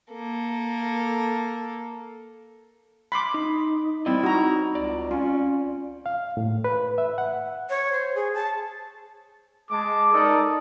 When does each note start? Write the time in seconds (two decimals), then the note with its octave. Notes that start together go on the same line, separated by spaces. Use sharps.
0.12 A#3 A4
3.12 B5 C6 D6
3.34 D#4
4.06 G3 C4 E4 D5 D#5
4.24 D#4 F#4 A#5
4.75 C#2 D5
5.11 C#4 F4
6.06 F5
6.37 A2
6.64 B4
6.98 E5
7.18 F#5
7.70 C#5
7.92 C5
8.15 G#4
8.34 A5
9.71 G#3 G#4 A5 D6
10.13 D#4 A4 A#4 D5 A5 D#6